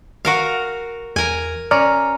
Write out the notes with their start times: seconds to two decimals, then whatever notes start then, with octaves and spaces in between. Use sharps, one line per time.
0.25 F#4 A#4 F5
1.16 E2 A#4 G#5
1.71 C#4 D5 A#5 F6